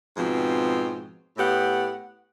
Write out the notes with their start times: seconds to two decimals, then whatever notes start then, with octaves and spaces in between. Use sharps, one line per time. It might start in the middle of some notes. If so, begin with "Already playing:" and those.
0.17 G#2 B2 F3 C4
1.38 A2 B3 G4 F#5